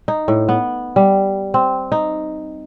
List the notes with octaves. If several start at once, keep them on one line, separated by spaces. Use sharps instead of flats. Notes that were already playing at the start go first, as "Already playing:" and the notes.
D#4
A2
B3
G3
C4
D#4